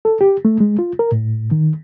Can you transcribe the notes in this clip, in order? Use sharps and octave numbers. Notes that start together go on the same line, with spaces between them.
A4
G4
A3
G#3
F4
A#4
A2
D#3